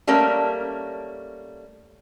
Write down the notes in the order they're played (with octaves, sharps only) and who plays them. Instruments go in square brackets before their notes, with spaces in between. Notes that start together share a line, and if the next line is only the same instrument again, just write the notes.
[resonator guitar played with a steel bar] G3 A3 A#3 C#4 A#4